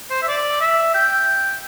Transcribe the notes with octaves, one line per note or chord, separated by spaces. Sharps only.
C5
E5
D5
E5
G5